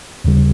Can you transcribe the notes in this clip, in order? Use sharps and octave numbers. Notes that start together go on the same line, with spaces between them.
D#2 C#3 G3